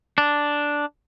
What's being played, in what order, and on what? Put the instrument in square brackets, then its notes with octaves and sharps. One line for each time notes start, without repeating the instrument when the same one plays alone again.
[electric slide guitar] D4